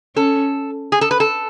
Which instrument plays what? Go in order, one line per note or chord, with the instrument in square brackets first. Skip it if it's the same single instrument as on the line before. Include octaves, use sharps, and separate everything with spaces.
[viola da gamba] C#4 [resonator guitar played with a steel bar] A4
[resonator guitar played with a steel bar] G#4
A4
B4
A4